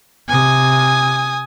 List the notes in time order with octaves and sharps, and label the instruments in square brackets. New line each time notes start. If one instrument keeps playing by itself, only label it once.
[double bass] C3 [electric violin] G#5 D#6